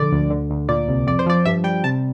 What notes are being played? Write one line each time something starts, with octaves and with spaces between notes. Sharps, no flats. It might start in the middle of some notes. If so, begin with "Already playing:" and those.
Already playing: A#1 D3 D5
D2
D3
D2
A#2 D5
C2
F2 D5
C5
F3 D5
G2 E5
G3 G5
C3 A5